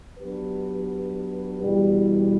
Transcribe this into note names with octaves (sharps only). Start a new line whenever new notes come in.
F#3 B3 D4 G4 B4
E2 B2 G3